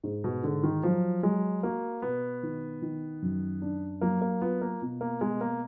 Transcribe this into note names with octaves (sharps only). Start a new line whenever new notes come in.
G#2
B2
G#2 D3
D#3
F3 F#3
F#3 G#3
A#3 F#4
B2 B3
D#3
D#3
F#2
D4
F#3 A#3
A#3
B3 F4
A#3
B2
A#3
B2 G#3
A#3